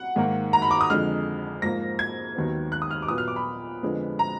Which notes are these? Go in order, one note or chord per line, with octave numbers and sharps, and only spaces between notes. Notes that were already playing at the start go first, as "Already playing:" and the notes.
Already playing: F#5
G#2 D#3 A#3
A#5
B5
D6
D#6
F2 D3 G#3 F6
G#2 F3 A#3 A#6
G#6
D#2 D#3 F#3 B3
F#6
D#6
F6
D6
A#2 F#3 B3 D#6
F6
D6
B5
F2 D3 F3 G#3 B3
A#5